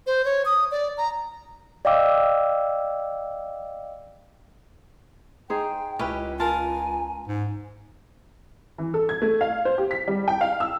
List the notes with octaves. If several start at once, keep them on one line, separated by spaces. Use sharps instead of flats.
C5
C#5
D#6
D5
A#5
D5 D#5 F5 G5 D6 E6
D#4 G#4 C5 G5
C#2 C#4 E4 G4 B4 D#5
F4 A#4 G#5 A5
G#2
E3
A4
G#6
A3
F5
C5
G4
B6
G3
G5
F5
E6